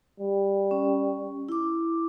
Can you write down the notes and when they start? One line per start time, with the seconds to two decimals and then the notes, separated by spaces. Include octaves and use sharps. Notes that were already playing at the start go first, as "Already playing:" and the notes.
0.20 G3
0.71 C#4
1.49 E4 D6